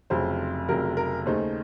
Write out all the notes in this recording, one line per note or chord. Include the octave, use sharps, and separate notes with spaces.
F1 F2 C#3 F#3 C5
F1 F2 C#3 F#3 A#4
A#4
D#2 C#3 A3 D#4 C5